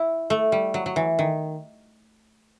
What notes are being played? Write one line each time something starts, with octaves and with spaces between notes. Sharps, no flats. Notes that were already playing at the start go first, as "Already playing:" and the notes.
Already playing: E4
A3
G3
F#3
F#3
E3
D#3